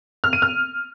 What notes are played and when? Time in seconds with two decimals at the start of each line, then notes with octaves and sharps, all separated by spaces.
0.24 F6
0.33 D#7
0.42 F6